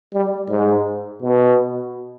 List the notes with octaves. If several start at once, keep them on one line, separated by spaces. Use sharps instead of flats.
G3
G#2
B2